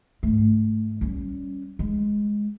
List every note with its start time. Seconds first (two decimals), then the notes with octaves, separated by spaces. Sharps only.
0.23 G#2 A3
1.01 G3 C#4
1.79 G#3